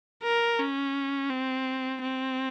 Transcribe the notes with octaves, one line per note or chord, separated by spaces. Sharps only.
A#4
C#4
C4
C4